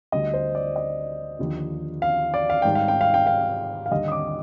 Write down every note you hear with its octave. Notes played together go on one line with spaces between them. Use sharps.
D2 D3 G3 D#5
C5
D5
D#5
D#2 D3 F3
F5
D5
F5
G#2 D#3 G3 G5
F5
G5
F5
G5
F5
F5
D#2 D3 G3 D#5
D#6
D6